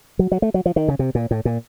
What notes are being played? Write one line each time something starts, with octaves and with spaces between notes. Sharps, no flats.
F#3
F#3
A3
F#3
F3
D#3
C#3
C3
A#2
A2
A#2